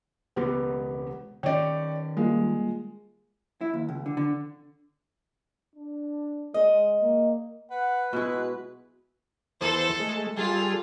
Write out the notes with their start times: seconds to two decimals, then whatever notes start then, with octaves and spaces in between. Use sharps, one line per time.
0.36 E1 C#2 B3 G4
1.43 D#3 C#4 C#5 D5 G5
2.17 G3 G#3 A#3 F4
3.61 E4
3.74 D#2
3.89 C#2
4.06 D3
4.17 D3
5.76 D4
6.54 G#3 D#5
7.02 A#3
7.71 B4 F#5
8.13 B2 G#3 B3 E4 F#4
9.61 E2 A4 C5
10.00 G#3 A3
10.37 G3 F4 G#4 A4